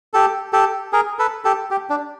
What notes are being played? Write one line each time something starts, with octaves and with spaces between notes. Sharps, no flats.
G4 A4
G4 A4
G#4 A#4
A4 B4
G4 A4
G4
D4